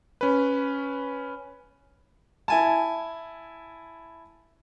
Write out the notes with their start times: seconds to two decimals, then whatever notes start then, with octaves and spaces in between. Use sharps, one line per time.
0.21 C#4 B4
2.48 E4 G#5 A5